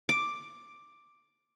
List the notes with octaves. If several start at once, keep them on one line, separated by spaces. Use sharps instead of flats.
D6